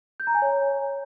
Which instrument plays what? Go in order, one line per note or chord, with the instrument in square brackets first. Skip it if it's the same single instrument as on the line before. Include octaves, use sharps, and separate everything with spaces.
[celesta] G6
A#5
G#5
C#5